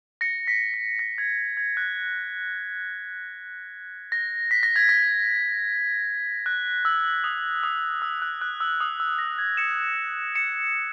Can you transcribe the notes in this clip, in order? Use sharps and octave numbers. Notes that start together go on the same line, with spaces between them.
A#6 C#7
B6
B6
A#6
G#6
G#6
F#6
A#6
B6
A#6
G#6
A#6
F#6
E6
D#6
D#6
E6
F#6
F#6
E6
D#6
E6
A#6
G#6
C#7 E7
C#7 E7